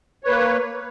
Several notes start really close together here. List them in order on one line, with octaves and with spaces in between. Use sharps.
C#5 B4 A#3